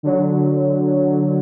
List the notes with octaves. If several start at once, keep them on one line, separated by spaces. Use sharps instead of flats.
D3 F#3